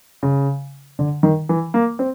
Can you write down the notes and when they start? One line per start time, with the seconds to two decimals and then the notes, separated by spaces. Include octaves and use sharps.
0.23 C#3
0.99 D3
1.23 D#3
1.49 E3
1.74 A#3
1.99 C4